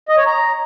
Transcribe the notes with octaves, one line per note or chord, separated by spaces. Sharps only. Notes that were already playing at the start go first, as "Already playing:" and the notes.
D#5
C#5
A#5